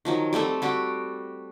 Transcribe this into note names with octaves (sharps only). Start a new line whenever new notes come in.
D#3 F3 F#3
G3 A3 C4 A4
G3 F#4 G4